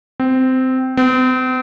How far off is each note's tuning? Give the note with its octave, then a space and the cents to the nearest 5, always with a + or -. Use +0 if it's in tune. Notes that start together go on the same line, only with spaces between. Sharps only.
C4 -15
C4 -45